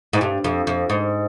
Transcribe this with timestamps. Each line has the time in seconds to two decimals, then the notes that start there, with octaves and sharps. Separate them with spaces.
0.13 G#2
0.21 G2
0.44 F2
0.67 F2
0.90 G#2